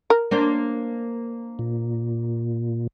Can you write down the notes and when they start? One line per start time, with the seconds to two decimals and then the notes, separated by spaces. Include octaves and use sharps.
0.10 A#4
0.31 A#3 D4 C5
1.59 A#2